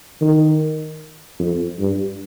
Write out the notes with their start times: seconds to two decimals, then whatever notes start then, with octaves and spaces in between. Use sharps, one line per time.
0.21 D#3
1.39 F2
1.79 G2